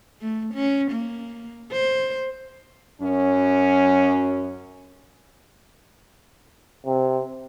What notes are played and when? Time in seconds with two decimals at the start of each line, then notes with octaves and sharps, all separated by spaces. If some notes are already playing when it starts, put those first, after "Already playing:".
0.21 A3
0.54 C#4
0.92 A#3
1.72 C5
3.01 F#2 C#4
6.86 C3